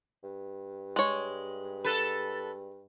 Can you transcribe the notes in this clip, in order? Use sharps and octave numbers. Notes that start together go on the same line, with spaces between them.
G2
G#3 C#5
A4 B4